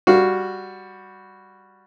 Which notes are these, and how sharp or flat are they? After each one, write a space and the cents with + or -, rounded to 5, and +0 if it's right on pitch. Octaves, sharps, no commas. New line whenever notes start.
G3 +0 F#4 +0 F5 +0